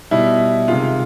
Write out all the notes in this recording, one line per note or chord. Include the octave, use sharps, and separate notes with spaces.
B2 G3 E4
C3 D#3 G#3 F4